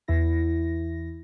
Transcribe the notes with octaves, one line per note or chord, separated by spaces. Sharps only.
E2 E3 E4 A#6